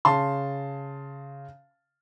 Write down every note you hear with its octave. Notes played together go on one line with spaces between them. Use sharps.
C#3 A5 C6